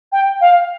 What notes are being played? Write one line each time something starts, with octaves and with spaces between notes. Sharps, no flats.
G5
F5